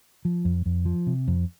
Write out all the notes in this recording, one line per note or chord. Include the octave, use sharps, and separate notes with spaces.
F3
F2
F2
F3
C3
F2